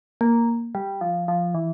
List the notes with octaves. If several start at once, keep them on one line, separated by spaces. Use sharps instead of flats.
A#3
G3
F3
F3
E3